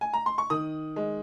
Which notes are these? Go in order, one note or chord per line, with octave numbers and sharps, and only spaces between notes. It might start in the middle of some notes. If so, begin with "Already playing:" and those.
G#5
A#5
C6
C#6
D#3 D#6
G#3